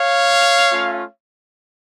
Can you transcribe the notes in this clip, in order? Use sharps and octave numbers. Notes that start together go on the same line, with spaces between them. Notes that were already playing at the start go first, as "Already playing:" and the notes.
Already playing: C#5 F5
A3 C#4 F4